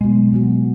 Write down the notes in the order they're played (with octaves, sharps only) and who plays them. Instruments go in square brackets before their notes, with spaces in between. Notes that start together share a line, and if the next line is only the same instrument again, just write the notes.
[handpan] B2 F#3 B3 F#4 [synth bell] G#3
[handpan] B2 F#3 B3 F#4